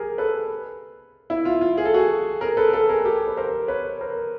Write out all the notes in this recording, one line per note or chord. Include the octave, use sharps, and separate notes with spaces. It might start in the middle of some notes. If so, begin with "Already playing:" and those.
Already playing: G4 G#4 A#4
A4 B4
E4
F4
F4
G#4
A4
F#4 G#4
G#4 A#4
A4 B4
A4 B4
G#4 A#4
G4 A4
B4
A#4 C5
B4 C#5
A#4 C5